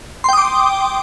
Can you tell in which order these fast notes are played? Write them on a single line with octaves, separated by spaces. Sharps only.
C6 G5 D#6 D6